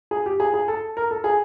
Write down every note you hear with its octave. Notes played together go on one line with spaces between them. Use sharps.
G#4
G4
G#4
G#4
A4
A#4
A4
G#4